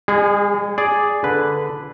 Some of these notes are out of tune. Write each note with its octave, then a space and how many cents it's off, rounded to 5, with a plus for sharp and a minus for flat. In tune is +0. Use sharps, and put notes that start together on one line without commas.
G#3 -40 G#4 +0
G#4 +0 D5 +0
D3 -10 B4 +0